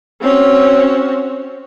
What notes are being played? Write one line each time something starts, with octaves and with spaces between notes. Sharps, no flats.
C4 C#4 F#4